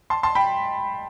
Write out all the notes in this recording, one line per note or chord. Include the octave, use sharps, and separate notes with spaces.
A5 C6
A5 C6
G5 B5